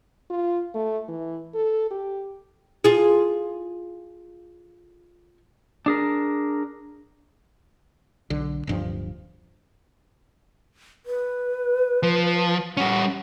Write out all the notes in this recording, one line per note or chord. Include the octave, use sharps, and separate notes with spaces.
F4
A3
E3
A4
G4
F4 G#4
D4 G#4 A#4
B1 D3
D1 G2 F3
B4
F3
G3 C#4 F#5